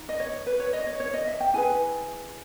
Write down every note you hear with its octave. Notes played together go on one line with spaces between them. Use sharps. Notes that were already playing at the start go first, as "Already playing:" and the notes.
Already playing: D#4
D#5
C#5
B4
C#5
D#5
C#5
C#5
D#5
E5
G5
E4 G#4 B4 G#5